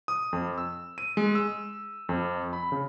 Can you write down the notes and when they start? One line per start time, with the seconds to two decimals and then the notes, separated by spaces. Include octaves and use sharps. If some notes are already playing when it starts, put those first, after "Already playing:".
0.08 D#6
0.33 F2
0.58 E6
0.98 D#7
1.17 G#3
1.35 E6
2.09 F2
2.53 B5
2.72 C#3